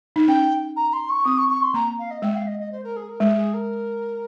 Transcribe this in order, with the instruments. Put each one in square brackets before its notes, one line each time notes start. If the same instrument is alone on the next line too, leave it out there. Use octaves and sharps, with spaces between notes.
[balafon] D#4
[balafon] C#4 [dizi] G5
[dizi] A#5
C6
C#6
[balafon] C4 [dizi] D#6
[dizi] C#6
C#6
C6
[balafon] A#3 [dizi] A#5
[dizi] F5
D#5
[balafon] G#3 [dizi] G5
[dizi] F5
D#5
D#5
C5
A#4
G#4
A#4
[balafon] G#3 [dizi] G#4
[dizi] G#4
A#4